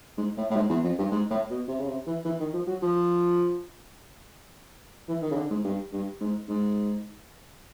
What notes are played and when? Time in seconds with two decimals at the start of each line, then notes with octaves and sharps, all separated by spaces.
0.17 G#2
0.37 A2
0.50 A2
0.56 G#2
0.69 E2
0.83 F2
0.98 G2
1.11 G#2
1.30 A2
1.50 B2
1.68 C3
1.79 C#3
1.87 C3
2.06 E3
2.24 E3
2.40 D#3
2.53 F3
2.67 F#3
2.82 F3
5.08 E3
5.21 D#3
5.31 C#3
5.36 D3
5.50 G#2
5.64 G2
5.93 G2
6.20 G#2
6.49 G#2